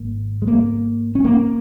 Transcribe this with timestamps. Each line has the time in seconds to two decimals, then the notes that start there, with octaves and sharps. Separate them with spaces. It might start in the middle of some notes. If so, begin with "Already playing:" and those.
Already playing: G#1 G#2 A#3
0.42 G#3
0.48 A#3
1.15 C#4
1.24 A#3